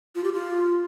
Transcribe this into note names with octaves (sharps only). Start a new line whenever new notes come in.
F4
G4
F4